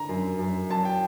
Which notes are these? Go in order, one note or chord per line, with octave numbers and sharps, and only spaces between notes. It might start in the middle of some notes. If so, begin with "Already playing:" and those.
Already playing: D3 A#5
F#2
F#2
F#3 A5
G5